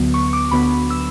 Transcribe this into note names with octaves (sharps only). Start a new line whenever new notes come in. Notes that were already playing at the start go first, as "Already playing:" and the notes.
Already playing: D2 D3 F#3 B3
C#6
D6
D2 D3 F#3 B3 B5
E6